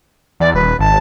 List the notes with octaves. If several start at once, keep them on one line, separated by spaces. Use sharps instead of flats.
E2 D5
D#1 B4
G#1 A5